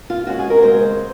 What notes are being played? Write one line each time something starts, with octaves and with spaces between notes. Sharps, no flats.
F4
D#2 D#3 G#3 C#4 F#4
G#4
A#4
D#2 C#3 G#3 C4 C5